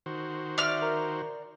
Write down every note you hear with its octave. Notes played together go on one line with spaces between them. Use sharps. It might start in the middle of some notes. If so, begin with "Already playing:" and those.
D#3 F#4 C5
D5 E5 F6
A#4 A#5